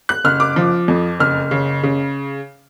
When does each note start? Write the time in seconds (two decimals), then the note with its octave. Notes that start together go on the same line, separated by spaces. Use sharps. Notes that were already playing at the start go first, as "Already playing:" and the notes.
0.09 F#6
0.24 F#1 F6
0.40 D6
0.56 F3
0.88 F2
1.20 F#1 F6
1.51 C#3
1.83 C#3